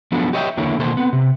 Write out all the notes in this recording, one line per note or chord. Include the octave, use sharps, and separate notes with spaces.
F3 F#3 B3 D4 A4
G4 C#5 D#5 E5 G5
E2 D3 A#3 E4 C#5
B2 D#3 A#3 A4 C5
B3 C4
C3